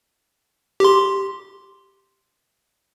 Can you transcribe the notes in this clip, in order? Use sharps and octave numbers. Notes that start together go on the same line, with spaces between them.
G4 C6